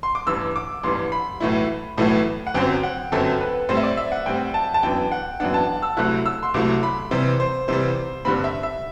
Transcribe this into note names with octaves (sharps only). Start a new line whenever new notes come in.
C6
D6
A1 G2 E3 G3 E6
D6
A1 G2 E3 G3 C6
B5
B1 A2 E3 A3 E4
B1 A2 E3 A3 E4
F#5
G1 F#2 F#3 C4 G5
F#5
G1 F#2 F#3 C4 A4
B4
A2 G3 C4 C5
E5
D5
E5
F#5
A2 G3 C4 G5
A5
A5
F#2 E3 B3 D4 G5
F#5
F#2 E3 B3 D4 F#5
A5
E6
C2 C3 F#3 A3 E4 F#6
E6
C6
C2 C3 F#3 A3 E4 D6
B5
C3 E3 G3 C5
C5
C3 E3 G3 C5
G2 D3 G3 C4 B5
E5
E5